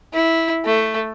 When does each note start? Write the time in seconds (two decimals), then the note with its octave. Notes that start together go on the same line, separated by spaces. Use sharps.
0.14 E4
0.65 A3